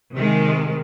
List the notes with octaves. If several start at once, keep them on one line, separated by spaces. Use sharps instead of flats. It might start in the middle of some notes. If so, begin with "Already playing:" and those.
C3 D#3 G#3